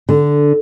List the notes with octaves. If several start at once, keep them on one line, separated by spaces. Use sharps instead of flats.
D3